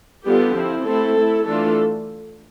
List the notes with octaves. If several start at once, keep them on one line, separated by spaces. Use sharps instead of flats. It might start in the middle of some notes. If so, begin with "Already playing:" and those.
D3 G3 B3 F4 G4
F3 C4 E4
A3 C4 E4 A4
A3 E4
E3 A3 D4 F4 A4